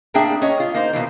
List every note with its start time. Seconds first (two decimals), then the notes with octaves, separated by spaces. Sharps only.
0.14 A2 A#3 D4 G#4 E5 G5
0.42 C#4 C#5 D#5
0.60 F4
0.74 A#3 D#4 C5
0.93 B2 E3 A#3